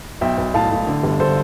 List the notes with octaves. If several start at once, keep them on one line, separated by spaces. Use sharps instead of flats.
B1 E5 G5
B1
A2 F5 A5
A2
D3
G1
D3 A4 C5